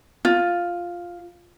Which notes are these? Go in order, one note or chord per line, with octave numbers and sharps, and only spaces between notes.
F4